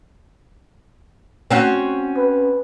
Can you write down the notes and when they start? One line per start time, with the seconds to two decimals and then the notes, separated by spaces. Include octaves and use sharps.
1.51 C4 C#4 F#4
2.17 B4